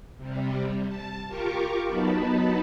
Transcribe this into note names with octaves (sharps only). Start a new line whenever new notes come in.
C3 G3
A5
F4 G4 A#4 C#6 D6
F#3 B3 D#4 A5 B5